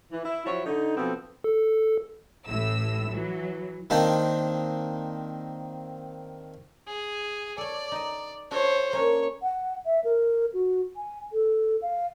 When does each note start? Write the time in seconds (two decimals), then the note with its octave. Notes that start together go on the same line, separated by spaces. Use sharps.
0.11 E3
0.24 E4
0.45 F3 F#3 E4 C#5
0.65 D3 D#4
0.96 B2 F3 B3 C4 A4
1.44 A4
2.47 A1 A2 E6
3.10 E3 F#3
3.90 D#3 A#3 C4 D4 D#4
6.87 G#4
7.58 A4 C#5 D5
7.92 D#4 D#5
8.51 D4 F#4 A4 C5 C#5
8.93 A#3 C#4 D4 C#5
9.42 F#5
9.86 E5
10.04 A#4
10.54 F#4
10.96 G#5
11.33 A4
11.82 F5